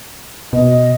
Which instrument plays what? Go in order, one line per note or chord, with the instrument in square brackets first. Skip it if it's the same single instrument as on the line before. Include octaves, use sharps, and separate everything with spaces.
[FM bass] B2 [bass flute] D#5